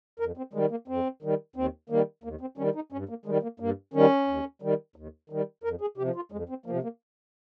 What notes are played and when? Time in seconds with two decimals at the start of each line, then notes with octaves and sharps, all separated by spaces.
0.19 F2 A#4
0.37 C4
0.53 D#3 G3 G#3
0.71 A#3
0.88 F2 C4
1.22 D#3 G3
1.56 D#2 C4
1.89 D#3 G3 A#3
2.24 D#2 A#3
2.41 C4
2.57 D#3 G3 C#4
2.75 D#4
2.92 G2 C#4
3.09 A#3
3.25 D#3 G3 G#3
3.42 A#3
3.60 G2 A#3
3.94 D#3 G3 C#4
4.28 D#2
4.62 D#3 G3
4.96 D#2
5.30 D#3 G3
5.63 F2 A#4
5.81 G#4
5.97 C3 G4
6.01 F3
6.15 F4
6.32 F2 G#3
6.49 C4
6.66 C3 F3 A#3
6.83 A#3